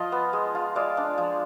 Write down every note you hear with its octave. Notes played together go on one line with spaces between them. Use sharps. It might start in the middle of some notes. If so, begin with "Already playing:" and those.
Already playing: F3 F4 D#5
B3
G#3
F4
G#3 D5 F5
D4
F3